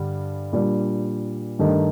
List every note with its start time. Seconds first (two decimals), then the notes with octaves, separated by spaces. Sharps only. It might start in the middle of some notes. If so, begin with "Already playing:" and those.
Already playing: G2 D3 G3
0.53 A#2 G3 D4
1.59 G2 D#3 A3 D#4 G4